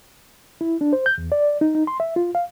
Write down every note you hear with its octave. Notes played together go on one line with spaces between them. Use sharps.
E4
D4
C5
G6
E2
D5
D#4
D#4
C6
E5
F4
F5